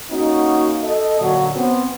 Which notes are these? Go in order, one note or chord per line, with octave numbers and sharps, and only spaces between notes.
A#3 C#4 D#4 F#4
A4 D#5
A#2 D3 F#3
B3 C4